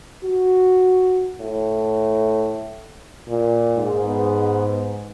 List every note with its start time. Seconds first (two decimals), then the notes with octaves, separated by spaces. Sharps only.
0.25 F#4
1.40 A2
3.28 A#2
3.74 G#2
4.06 B3